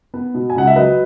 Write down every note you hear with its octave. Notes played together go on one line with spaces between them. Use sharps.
B3
B2
G#5
C#2 F#5
E5
F#3 B4 D#5